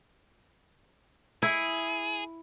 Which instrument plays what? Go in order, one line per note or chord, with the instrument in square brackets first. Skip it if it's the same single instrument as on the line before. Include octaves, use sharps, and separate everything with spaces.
[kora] E4 [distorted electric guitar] G#4